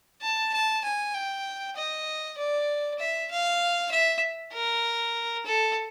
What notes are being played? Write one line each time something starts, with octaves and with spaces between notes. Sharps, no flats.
A5
A5
G#5
G5
D#5
D5
E5
F5
E5
A#4
A4